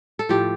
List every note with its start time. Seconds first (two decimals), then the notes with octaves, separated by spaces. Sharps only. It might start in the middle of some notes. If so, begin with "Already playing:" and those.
0.19 A4
0.29 A2 F3 G4